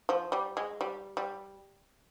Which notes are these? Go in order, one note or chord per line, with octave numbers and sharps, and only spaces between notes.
F3
G3
G#3
G3
G3